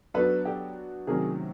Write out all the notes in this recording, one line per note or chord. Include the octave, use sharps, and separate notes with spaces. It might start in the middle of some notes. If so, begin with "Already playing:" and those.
F#3 B3 D4 F#4 A4 B4
G4 A4
C3 D#3 F#3 A3 C#4 G#4 A#4